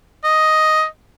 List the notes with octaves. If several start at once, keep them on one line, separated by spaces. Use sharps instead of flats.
D#5